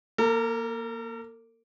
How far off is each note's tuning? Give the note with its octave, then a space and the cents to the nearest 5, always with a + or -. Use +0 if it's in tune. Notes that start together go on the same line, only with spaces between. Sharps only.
A#3 +10 A#4 -45